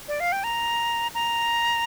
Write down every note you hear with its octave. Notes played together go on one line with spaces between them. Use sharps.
D5
F5
G5
A#5
A#5